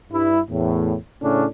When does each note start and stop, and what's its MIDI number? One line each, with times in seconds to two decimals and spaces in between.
0.11 0.39 43
0.11 0.39 64
0.49 0.95 40
0.49 0.95 45
1.22 1.45 45
1.22 1.45 49
1.22 1.45 61
1.22 1.45 62